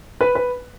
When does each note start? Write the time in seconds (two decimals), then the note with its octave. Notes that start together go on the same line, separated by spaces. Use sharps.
0.21 B4
0.35 B4